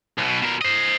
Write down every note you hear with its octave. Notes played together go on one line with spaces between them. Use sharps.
B1 B2
B2 A#4
C5 D#5